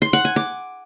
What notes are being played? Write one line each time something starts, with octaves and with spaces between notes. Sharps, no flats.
C6
F#5
G#5
D6